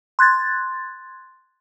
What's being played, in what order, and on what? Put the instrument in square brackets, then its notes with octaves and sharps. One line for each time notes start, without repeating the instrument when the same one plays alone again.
[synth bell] C6 F#6 G#6 A6